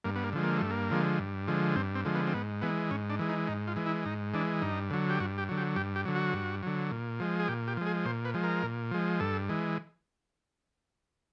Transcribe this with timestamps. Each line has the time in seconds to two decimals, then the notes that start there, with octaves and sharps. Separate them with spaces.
0.04 G2 A#3
0.16 B3
0.24 A#3
0.33 D3 F3 G#3
0.43 A#3
0.57 G2 A3
0.70 A#3
0.91 D3 F3 G#3
1.19 G2
1.48 D3 F3 G#3
1.76 G2 C4
1.95 C4
2.05 D3 F3 G#3
2.15 B3
2.27 C4
2.34 G#2 B3
2.62 E3 G#3 B3
2.90 G#2 C#4
3.10 D4
3.19 E3 G#3
3.29 D#4
3.48 G#2 D#4
3.68 F4
3.76 E3 G#3
3.86 E4
4.05 G#2 D#4
4.34 E3 G#3 D4
4.62 G2 D#4
4.90 D3 F#3
5.10 G4
5.20 G2 F#4
5.38 G4
5.49 D3 F#3
5.57 G4
5.76 G2 G4
5.96 G4
6.05 D3 F#3
6.16 F#4
6.34 G2
6.63 D3 F#3
6.92 A#2
7.20 F3 G#3
7.40 G#4
7.48 A#2 G4
7.68 G4
7.77 F3 G#3
7.87 G#4
8.05 A#2 C5
8.25 B4
8.34 F3 G#3
8.43 A#4
8.63 A#2
8.91 F3 G#3
9.20 G2 A4
9.49 E3 G#3